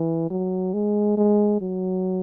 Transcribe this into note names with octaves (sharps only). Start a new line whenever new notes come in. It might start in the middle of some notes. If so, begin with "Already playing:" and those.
Already playing: E3
F#3
G#3
G#3
F#3